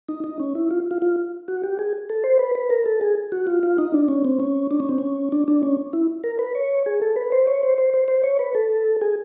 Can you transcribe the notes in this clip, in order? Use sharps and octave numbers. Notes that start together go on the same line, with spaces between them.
D#4
D#4
C#4
E4
F4
F4
F4
F#4
G4
G#4
A4
C5
B4
B4
A#4
A4
G#4
F#4
F4
F4
D#4
D4
C#4
C4
C#4
D4
C#4
C4
C#4
D4
D4
C#4
E4
A#4
B4
C#5
G#4
A4
B4
C5
C#5
C5
C5
C5
C5
C#5
B4
A4
G#4